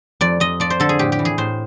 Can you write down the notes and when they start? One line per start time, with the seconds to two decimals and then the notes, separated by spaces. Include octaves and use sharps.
0.21 F2 D5
0.40 F2 D#5
0.60 F3 D5
0.70 C5
0.80 D3 A4
0.89 G#4
0.99 A2 G4
1.12 G4
1.19 E3
1.25 G#4
1.38 A2 C5